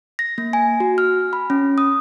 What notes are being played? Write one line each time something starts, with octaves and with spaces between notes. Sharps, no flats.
A#6
A#3
G#5
F#4
F6
B5
C#4
D#6